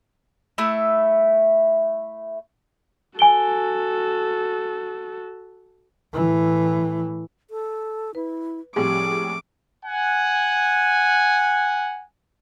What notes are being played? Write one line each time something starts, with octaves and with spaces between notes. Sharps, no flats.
A3 E4
F#4 A4 G#5 D7 G7
A2 E3
A4
E4 B4
A2 F3 G3 C4 G4 G#4 D6
F#5 G#5